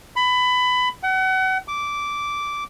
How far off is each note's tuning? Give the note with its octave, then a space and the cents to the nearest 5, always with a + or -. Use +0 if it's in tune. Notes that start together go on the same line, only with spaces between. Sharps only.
B5 +20
F#5 +35
D6 -10